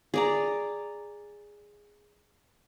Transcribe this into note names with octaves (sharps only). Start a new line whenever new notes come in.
G#4 D5 A#5